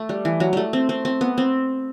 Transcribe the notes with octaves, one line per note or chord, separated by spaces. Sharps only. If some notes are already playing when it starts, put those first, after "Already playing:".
Already playing: A3
G3
E3
F#3
G3 A3
C4
C4
C4
B3
C4